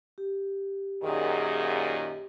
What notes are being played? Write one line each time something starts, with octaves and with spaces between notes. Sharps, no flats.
G4
F#2 A#2 D#3 G#4